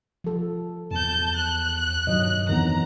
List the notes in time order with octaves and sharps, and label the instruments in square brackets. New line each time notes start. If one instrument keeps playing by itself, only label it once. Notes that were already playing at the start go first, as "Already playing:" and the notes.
[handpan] F3 A4
[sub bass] E2 [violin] A5 G6
[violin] F#6
[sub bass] G2 [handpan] D#3 F#3 D#5
[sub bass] F2 [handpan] D#3 E3 B3 [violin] A#5